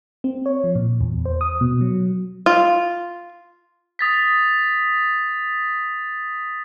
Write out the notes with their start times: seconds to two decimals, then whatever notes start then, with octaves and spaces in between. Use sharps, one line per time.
0.24 C4
0.46 C#5
0.64 F3
0.75 A#2
1.01 E2
1.25 C5
1.41 D#6
1.61 B2
1.81 F#3
2.46 F4
3.99 D#6 A6 B6